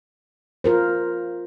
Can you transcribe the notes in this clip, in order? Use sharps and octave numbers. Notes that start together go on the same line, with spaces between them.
F4 A#4 C5